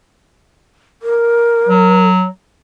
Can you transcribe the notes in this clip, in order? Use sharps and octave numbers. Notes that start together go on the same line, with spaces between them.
A#4
F#3